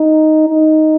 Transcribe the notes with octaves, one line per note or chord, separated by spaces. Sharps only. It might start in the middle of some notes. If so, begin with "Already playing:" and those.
Already playing: D#4
D#4